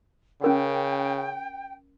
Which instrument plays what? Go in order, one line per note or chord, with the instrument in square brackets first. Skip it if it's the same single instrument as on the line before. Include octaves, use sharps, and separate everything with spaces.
[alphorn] C#3 [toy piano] C#4 A#4 F#5 [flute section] G5